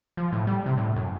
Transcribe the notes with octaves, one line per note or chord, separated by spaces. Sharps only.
F3
A2
G3
C3
A2
F#2